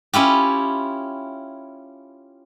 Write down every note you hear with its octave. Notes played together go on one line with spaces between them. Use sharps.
C#4 E4 F4 G4